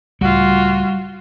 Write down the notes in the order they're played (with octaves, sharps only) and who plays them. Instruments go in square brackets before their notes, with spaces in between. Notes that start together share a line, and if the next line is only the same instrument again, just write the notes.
[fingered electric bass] C#2 A2 [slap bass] G3 [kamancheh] F4 F#4